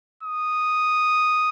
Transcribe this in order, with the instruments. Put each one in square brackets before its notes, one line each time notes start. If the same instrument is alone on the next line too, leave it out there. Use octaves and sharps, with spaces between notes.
[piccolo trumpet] D#6